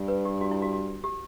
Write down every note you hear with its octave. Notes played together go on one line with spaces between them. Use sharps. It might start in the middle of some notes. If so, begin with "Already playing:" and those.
Already playing: G2
B4
G4
F#4
E4
F#4
F#4
G4